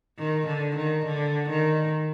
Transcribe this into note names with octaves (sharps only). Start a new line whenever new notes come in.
D#3
D3
D#3
D3
D#3